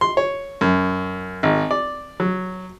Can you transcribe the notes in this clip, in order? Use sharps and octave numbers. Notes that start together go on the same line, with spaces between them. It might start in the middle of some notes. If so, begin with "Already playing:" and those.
C6
C#5
F#2
G#1
D5
F#3